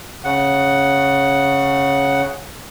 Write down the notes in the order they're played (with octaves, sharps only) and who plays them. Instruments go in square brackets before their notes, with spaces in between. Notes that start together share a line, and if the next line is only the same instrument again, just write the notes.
[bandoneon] C#3 F#5